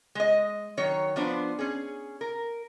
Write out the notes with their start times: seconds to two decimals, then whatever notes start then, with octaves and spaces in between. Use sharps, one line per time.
0.15 G#3 D#5
0.77 D#3 F#3 C#5
1.16 F3 B3 D4 C5
1.59 C#4 G#4
2.21 A#4